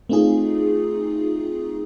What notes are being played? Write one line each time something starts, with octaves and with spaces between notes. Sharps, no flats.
A3 C4 D#4 F4 G#4